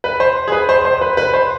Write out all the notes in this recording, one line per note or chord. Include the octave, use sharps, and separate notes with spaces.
B4
C5
G#4
B4
C5
C5
B4
B4
C5